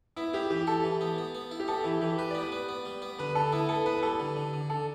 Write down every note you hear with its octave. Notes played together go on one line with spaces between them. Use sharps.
B3 E4
B3 G4
E3 G4
E4 A4
E3
B3
B3
B3
E4
G4
B3 A4
E3 E4
E3 G4
G4 B4
B3 D5
B4
B3
B3
G3
B3
D3 B4
D3 A4
B3 E4
B3 A4
B3 B4
G3 A4
D3
D3
D3
D3 A4